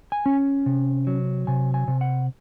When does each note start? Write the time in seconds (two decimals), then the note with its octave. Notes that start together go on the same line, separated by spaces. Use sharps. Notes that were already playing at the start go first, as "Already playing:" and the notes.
0.12 G#5
0.26 C#4
0.66 C3
1.07 F#3
1.47 C3 G#5
1.74 G#5
1.88 C3
2.01 F#5